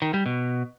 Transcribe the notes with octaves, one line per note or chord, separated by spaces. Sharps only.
D#3
G3
B2